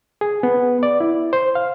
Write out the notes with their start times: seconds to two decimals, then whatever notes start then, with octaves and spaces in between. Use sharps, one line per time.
0.21 G#4
0.43 B3
0.83 D5
1.00 E4
1.33 C5
1.55 F5